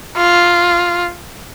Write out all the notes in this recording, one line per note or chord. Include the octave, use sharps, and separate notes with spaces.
F4